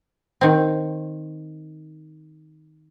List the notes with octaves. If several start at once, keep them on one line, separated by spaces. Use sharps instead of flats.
D#3 C4